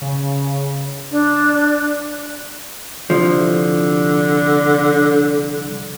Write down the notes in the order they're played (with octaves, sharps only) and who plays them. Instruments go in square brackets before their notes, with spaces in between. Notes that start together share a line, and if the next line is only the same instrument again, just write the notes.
[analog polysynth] C#3
[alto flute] D4
[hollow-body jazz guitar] C2 F3 [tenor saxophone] D3